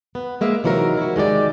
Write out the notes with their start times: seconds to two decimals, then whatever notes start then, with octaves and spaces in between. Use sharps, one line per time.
0.15 B3
0.41 G#3 A#3 E5
0.64 C3 E3 F#3 D#4 A#4
0.97 E4 F#4
1.16 D#3 G#3 G4 D5